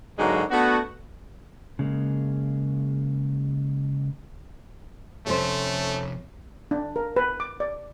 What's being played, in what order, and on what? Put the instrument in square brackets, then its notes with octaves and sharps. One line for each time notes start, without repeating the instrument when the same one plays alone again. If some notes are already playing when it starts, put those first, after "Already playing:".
[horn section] G#2 D3 F#3 G#3 A#3 F#4
A3 B3 D4 F#4
[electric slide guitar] C#3 G#3 A#3
[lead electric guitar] F2 C3 [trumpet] A3 [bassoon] C#4 [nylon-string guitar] A4 C5
[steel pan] D4
A#4
B4
D6
D5